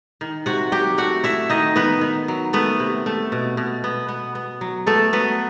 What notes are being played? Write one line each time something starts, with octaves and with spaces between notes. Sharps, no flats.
D#3
C3 F#4 F#5
F#3 G4 G5
A3 F#4 F#5
A3 E4 E5
D#3 D#4 D#5
D#3 B3 B4
D#3
F#3
A3 B3 B4
C3
A3
B2
B2
B3
B3
B3
F#3
A3 B3 A4
F#3 B3 B4